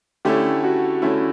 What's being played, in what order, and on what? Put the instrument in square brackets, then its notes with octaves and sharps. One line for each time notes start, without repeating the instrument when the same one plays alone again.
[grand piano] D3 A3 C#4 E4 [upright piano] G4
[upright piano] F#4
[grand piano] D3 A3 C#4 E4